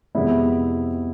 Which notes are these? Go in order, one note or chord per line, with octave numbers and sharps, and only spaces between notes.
F2 C3 G#3 B3 E4